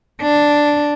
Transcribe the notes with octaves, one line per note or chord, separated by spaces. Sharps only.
D4